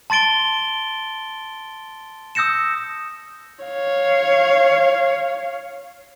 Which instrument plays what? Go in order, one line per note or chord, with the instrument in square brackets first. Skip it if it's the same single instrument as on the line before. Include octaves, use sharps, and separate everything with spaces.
[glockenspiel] A5 C6 A6 D7 G7
D#6 E6 G6 A#6 C#7 E7
[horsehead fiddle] C#5 F5